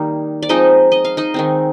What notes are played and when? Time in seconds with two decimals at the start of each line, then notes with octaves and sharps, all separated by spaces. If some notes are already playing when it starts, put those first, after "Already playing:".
Already playing: D#3 G3 A#3 D#4
0.42 D5
0.49 F3 G#3 C4 D#4 D#5
0.92 D#5
1.05 F5
1.17 D#4 D#5
1.34 D#3 G#3 C4